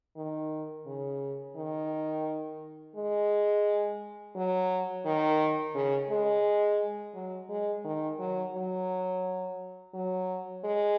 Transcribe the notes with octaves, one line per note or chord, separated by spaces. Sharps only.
D#3
C#3
D#3
G#3
F#3
D#3
C#3
G#3
F#3
G#3
D#3
F#3
F#3
F#3
G#3